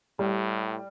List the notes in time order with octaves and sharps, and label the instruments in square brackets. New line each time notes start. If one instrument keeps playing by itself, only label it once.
[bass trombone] A2 [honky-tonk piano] G3